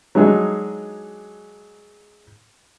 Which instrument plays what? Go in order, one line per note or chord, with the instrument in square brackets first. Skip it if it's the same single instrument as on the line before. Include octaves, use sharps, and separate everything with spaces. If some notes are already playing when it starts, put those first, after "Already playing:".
[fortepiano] F#3 G#3 D4 D#4 G#4